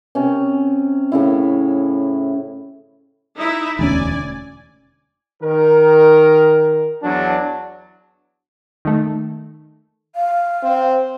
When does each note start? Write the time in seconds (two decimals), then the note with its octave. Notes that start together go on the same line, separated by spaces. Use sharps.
0.15 C3 C#4
1.12 A2 C#3 E4
3.38 D#4 E4 E5
3.79 E1 D2 C#4 D5 G#5
5.42 D#3 A#4
7.02 E2 F#3 D4
8.85 D#3 A3
10.16 F5
10.63 C4